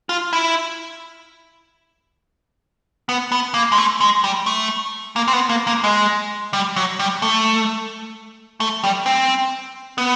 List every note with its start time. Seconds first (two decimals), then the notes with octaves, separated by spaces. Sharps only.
0.09 F4
0.33 E4
3.09 B3
3.32 B3
3.54 A#3
3.72 G#3
3.78 A3
4.01 G#3
4.24 G3
4.46 A3
5.16 A#3
5.28 C4
5.33 B3
5.49 A#3
5.67 A#3
5.84 G#3
6.53 G3
6.76 F#3
6.99 G3
7.22 A3
8.60 A3
8.84 G3
9.06 C4
9.98 B3